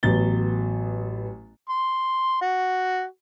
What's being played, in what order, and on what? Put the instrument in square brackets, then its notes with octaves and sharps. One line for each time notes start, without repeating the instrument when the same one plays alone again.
[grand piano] A1 F#3 B3 A6 G7
[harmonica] C6
F#4